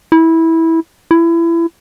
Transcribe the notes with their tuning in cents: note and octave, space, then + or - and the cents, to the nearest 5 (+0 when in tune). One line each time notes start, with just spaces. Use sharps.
E4 -15
E4 +25